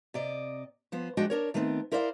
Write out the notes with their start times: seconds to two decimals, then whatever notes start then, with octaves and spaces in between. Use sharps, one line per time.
0.14 C3 D5 D#5
0.92 F3 B3 C5
1.17 F3 G#3 D4 F#4 D#5 G5
1.30 D4 A#4 C#5
1.54 D#3 A3 B3 C4
1.92 E4 A#4 C5 D5 E5 F5